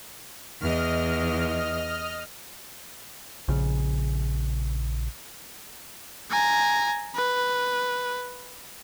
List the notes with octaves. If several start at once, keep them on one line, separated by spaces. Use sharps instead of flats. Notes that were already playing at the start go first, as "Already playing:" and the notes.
E2 D#5 F6
A#1 C#3
G#5 A#5
B4